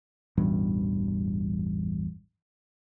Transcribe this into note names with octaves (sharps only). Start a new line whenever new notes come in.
A1 E2 G2 B2